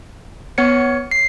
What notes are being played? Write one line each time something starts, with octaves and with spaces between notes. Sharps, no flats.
B3 C#5 C#7
C7